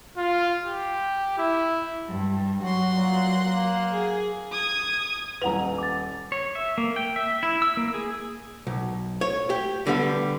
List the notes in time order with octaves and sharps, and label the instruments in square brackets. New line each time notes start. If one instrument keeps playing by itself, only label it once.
[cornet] F4
G4
E4
[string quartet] G2
[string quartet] F#3 F#5 C6 [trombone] F#4
[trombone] A#2
A#3
[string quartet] G#4
[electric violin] D#6 G#6
[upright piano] D#1 F7 [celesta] B4 F#5 A#5
[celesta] D6 A6
[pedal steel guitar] C#5
E5
A#3
G5
E5
E4
E6
A#3
G#4
[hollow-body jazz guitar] B1
C#5
G4
D3 G3 B3